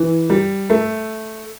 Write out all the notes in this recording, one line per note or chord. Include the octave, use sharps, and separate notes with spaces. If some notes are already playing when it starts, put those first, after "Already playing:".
Already playing: E3
G3
A3